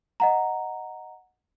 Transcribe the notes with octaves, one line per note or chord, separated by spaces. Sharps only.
D#5 F#5 A#5